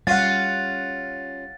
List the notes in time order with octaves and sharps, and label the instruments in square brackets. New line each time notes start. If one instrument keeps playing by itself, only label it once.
[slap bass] G3 [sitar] C#4 F4 [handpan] F5 F#5 [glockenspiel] A6